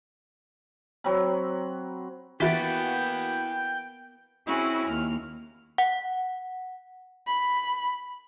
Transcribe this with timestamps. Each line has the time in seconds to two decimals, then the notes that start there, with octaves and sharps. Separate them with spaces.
1.04 F#3 C4 B5
2.40 E3 A#3 B3 E4 F#4 G5 A6 B6
4.46 C4 C#4 E4 F#4 G#4
4.87 D#2 F6
5.78 F#5
7.27 B5